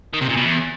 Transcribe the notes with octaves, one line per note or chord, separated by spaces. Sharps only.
D#3
C3
A#2
B2
E2